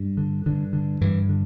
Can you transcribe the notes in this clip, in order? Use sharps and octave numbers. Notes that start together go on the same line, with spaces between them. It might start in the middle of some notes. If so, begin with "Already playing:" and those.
Already playing: G2
D3
G2 D3
D3
G2 E3
D3